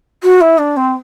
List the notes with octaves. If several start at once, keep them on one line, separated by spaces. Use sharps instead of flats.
F#4
E4
D4
C4